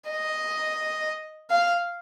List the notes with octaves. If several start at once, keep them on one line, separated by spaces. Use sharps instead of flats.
D#5
F5